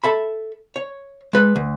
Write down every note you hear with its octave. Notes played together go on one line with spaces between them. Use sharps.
A4 E5 B5
C#5
G#3 B4
D2